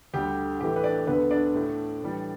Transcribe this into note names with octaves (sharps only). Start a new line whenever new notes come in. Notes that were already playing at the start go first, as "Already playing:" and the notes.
D2 D3 G3 G4
A2 E3 A3 G4
B4
D4 D5
D2 D3 A3 B3 B4
D4 D5
A2 A3
A2 E3 G3